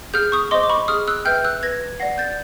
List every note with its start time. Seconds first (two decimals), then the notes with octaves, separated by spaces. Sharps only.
0.14 G#4 F6 G6
0.32 C#6 D#6
0.51 C5 D#5 C6 D6
0.63 D6
0.69 B5 C#6
0.88 G#4 D#6 F6
1.08 E6 F#6
1.25 B4 E5 G5 F6 G6
1.44 E6 F#6
1.63 B4 G#6 A#6
2.00 D5 F#5 A#6 C7
2.18 G6 A6